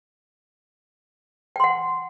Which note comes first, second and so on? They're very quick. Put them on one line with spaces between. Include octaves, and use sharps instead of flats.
G5 C6 F#5